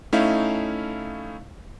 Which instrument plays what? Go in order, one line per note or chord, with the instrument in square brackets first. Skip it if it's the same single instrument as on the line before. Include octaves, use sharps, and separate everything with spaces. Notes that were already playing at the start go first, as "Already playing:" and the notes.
[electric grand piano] A3 C#4 D#4 E4 E5 F5